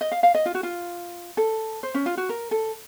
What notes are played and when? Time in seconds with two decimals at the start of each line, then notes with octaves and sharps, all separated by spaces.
0.01 D#5
0.12 F5
0.23 F5
0.35 D#5
0.46 F4
0.55 F#4
0.63 F4
1.37 A4
1.83 C5
1.94 C#4
2.06 F4
2.17 F#4
2.29 A#4
2.51 A4